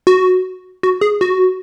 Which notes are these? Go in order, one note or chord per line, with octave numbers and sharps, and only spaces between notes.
F#4
F#4
G#4
F#4